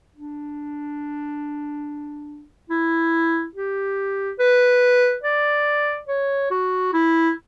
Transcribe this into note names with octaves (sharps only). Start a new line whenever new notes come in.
D4
E4
G4
B4
D5
C#5
F#4
E4